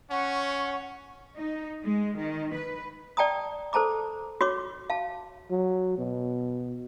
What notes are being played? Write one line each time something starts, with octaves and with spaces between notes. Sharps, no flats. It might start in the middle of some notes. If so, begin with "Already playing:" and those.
C#4 F#5 C#6
D#4
G#3
D#3
B4
D5 G5 A5 A#5 D#6
A4 C5 A5 A#5 D6
F#4 C#5 C6 D6
F5 A5
F#3
B2